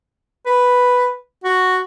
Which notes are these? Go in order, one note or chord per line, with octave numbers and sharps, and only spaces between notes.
B4
F#4